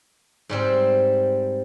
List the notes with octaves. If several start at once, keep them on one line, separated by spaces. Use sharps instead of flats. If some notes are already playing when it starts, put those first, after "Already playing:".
G#2 G3 C4